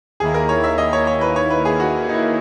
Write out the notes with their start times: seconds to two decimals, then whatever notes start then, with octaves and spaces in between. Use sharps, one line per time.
0.20 D#2 D#3 A#3 E4 G#4
0.34 A#4
0.49 C#5
0.64 E5
0.78 D#5
0.93 C#5
1.07 C#5
1.21 B4
1.36 C#5
1.50 B4
1.65 G#4
1.80 F#4
2.09 D#4
2.14 E4